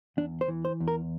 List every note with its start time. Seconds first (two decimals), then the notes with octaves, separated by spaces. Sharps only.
0.17 E2 D4
0.41 C5
0.48 E3
0.65 C5
0.80 E2
0.88 A#4